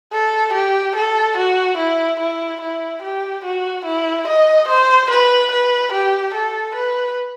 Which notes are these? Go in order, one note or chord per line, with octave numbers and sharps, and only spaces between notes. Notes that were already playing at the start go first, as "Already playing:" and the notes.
A4
G4
A4
F#4
E4
E4
E4
G4
F#4
E4
D#5
C5
B4
B4
G4
A4
B4